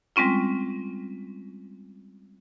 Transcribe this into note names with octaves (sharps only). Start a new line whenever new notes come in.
G3 G#3 C4 C#4 F4